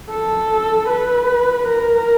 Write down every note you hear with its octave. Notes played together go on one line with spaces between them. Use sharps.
A4
B4
A#4